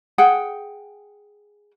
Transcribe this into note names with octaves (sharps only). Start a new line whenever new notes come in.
G#4 F#5 G5